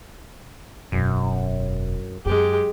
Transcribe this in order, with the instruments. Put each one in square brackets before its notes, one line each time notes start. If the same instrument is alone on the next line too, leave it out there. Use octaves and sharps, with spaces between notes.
[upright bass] E1 [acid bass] F#2
[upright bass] F#2 [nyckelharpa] G#3 G4